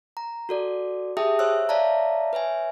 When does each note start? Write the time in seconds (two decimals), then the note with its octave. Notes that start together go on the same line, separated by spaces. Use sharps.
0.17 A#5
0.49 F#4 A4 D5
1.17 G4 G#4 E5 G5 A5 D#6
1.39 C5 C#5 E5 E6 F#6
1.69 C#5 D5 E5 F5 A5 A#5
2.33 B4 C#5 E5 G#5